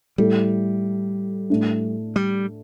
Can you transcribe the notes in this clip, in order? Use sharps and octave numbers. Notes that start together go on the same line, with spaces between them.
A2 G3 A3 E4 A4
A2 A3 D4
G3